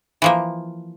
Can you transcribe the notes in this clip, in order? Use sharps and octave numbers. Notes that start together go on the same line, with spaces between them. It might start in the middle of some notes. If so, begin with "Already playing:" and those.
E3 F3 A#3